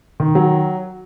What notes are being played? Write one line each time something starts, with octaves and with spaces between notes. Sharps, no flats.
D#3
F#3